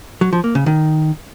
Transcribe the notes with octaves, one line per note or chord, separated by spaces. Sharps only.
F#3
F3
A#3
C#3
D#3